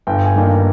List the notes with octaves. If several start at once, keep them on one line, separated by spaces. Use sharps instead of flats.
G1 G5
G#5
G2 D#3 A#3